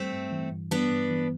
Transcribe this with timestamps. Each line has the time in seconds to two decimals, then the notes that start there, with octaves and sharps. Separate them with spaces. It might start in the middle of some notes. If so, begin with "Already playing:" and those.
Already playing: G3 A3 C4
0.12 G2
0.32 E3
0.52 G2
0.71 G3 B3 D4
0.92 G2
1.10 E3